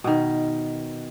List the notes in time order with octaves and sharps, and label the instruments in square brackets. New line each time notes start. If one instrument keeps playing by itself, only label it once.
[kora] B2 D#3